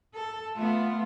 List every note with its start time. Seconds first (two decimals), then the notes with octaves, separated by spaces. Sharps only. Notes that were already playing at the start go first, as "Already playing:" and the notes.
0.14 A4
0.56 A3 B3 F4